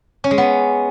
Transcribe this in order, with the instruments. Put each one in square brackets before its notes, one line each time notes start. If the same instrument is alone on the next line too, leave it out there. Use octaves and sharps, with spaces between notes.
[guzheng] C#4
G#3
B3